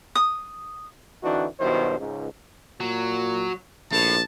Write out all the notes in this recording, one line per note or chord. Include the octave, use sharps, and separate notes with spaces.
D#6
D3 E3 C4 D4 D#4 F#4
G2 B2 D#3 F#3 E4 C5
C#2 G#2
A#2 F#3
A#1 A2 A5